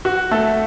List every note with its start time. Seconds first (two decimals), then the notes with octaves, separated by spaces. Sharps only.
0.05 F#4
0.31 A3 A4